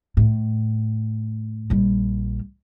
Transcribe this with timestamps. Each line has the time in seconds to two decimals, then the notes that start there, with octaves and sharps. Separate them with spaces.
0.17 A2
1.70 A#1 G3